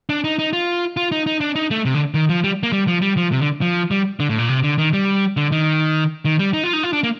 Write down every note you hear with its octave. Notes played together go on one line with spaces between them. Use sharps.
D4
D#4
D#4
F4
F4
D#4
D#4
D4
D#4
A3
C3
D3
D#3
F3
G3
A#3
G3
F3
G3
F3
C3
D3
F3
G3
D3
A2
A#2
C3
D3
D#3
G3
D3
D#3
D#3
G3
D#4
F4
D#4
F4
D4
A#3